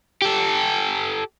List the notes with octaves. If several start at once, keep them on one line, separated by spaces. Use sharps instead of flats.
G4 A4